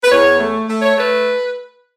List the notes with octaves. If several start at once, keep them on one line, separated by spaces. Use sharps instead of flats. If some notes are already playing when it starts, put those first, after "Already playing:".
B4
E2 C#5
A3
A3
C#5
A3 B4